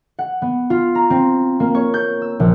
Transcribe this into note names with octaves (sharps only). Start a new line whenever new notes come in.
F#5
B3
F4
A#5
C4
A#3
C#5
G6
E6
A#1